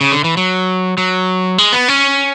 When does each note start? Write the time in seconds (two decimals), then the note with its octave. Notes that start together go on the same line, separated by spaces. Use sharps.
0.01 C#3
0.12 D3
0.24 E3
0.37 F#3
0.98 F#3
1.58 G#3
1.73 B3
1.88 C#4